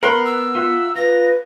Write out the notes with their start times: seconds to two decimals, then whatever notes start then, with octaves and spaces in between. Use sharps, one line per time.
0.03 B3 A#4 F#5 B5 C6
0.25 E6
0.55 F4 E5 F#5
0.96 F4 B4 A#6